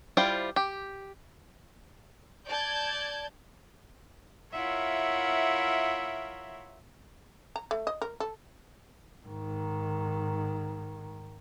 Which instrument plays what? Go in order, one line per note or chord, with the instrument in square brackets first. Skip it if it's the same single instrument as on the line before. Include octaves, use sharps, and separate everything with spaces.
[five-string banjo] G3 E4 F4 C5 G5
G4
[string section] D5 A5 G6 G#6
[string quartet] E4 F4 A#4 C#5 E5 F#5
[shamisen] A#5
A3
D#5
A#4
A4
[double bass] G#2 D#3